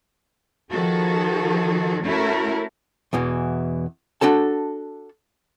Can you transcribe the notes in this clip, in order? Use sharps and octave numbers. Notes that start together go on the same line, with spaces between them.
D#3 F3 F#4 G#4 A4
A3 C#4 E4 F#4 A4 A#4
E2 B2 E3
D4 F#4 A4 A5